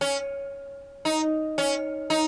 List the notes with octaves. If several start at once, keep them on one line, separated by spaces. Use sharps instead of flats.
C#4
D#4
C#4
D#4